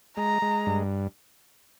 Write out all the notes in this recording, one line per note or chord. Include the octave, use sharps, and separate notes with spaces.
G#3 A#5
G#3
G2